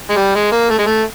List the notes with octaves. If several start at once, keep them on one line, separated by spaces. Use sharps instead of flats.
G#3
G3
G#3
A#3
A3
G#3
A3